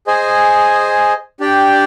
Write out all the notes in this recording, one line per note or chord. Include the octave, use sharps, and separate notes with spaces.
G#4 C5 D#5 G#5
D4 G4 D5 G5